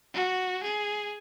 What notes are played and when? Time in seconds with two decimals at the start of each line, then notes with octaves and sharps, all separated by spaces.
0.14 F#4
0.64 G#4